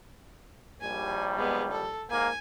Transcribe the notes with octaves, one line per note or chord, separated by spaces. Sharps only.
A#1 D#2 G3 G#5
G#3 B3
A4
G#2 A#3 G#5